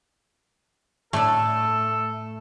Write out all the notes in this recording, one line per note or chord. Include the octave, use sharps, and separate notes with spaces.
A2 A3 D4 A4